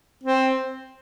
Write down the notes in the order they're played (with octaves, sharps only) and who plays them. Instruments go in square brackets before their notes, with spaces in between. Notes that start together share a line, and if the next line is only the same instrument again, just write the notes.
[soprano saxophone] C4